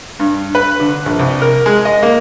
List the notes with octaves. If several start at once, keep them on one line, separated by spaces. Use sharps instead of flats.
G2
B4
D3
A#1
C2
A#4
G#3
D#5
A#3